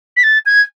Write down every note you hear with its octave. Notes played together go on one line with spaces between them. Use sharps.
B6
A6
G#6